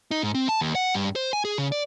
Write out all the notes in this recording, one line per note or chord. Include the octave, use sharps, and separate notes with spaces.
D#4
G#2
C4
A5
D#2
F#5
G2
C5
G#5
G#4
C#3
D5